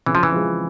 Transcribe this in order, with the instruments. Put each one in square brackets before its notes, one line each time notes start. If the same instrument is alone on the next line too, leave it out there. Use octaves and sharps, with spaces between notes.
[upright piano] C#3 [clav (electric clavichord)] E3
[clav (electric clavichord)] F3
E3
[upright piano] F3 G#3